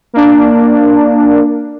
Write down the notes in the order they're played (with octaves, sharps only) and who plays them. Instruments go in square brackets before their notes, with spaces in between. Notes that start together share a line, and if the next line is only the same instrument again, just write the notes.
[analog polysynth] A#3 D4